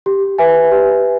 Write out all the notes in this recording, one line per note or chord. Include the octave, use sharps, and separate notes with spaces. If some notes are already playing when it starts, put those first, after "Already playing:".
G4
B4 E5 G#5
G4